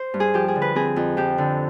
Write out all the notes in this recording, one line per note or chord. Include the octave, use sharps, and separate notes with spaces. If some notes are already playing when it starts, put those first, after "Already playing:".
Already playing: C5
G2
G#4
F3 G4
G#4
D3
B4
C4 G#4
F2
F3 G4
D3